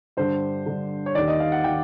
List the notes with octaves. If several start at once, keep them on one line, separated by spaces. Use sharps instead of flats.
G2 D3 C5
G2 D3
C#5
D#2 D#3 D5
D#5
F5
F#5
D#3 G5